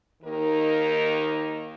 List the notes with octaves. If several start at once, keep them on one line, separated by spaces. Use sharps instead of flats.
D#2 D#3 A#3 D#4 A#4